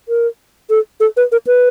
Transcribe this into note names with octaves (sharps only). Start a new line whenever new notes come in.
A#4
A4
A4
B4
A#4
B4